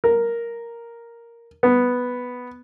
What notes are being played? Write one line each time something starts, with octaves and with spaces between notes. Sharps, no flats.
A#4
B3